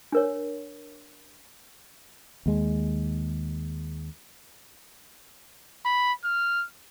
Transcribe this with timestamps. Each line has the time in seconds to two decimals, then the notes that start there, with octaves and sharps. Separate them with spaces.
0.12 D4 A#4 C#5
2.46 D#2 G#3
5.85 B5
6.25 F6